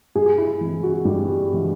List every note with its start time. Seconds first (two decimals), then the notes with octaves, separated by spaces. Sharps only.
0.15 G2 G#4
0.38 E4
0.61 E3 G#3 C4
0.83 F#4
1.05 G2 G4
1.49 E3 G#3 C4